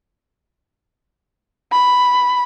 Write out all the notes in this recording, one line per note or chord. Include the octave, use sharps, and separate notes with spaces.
B5